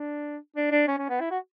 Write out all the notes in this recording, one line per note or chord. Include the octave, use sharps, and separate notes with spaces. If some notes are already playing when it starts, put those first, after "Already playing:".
Already playing: D4
D4
D4
C#4
C#4
B3
E4
F#4